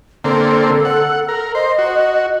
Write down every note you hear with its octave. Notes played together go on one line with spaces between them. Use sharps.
D3 A#3 C4 A4
F#5
A#4
C5 D#5
F#4